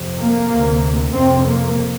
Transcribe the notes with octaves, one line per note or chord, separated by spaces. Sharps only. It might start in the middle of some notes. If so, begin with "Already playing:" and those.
Already playing: F2 C3
A#3
D2 C3
F2 C3 C4
A#3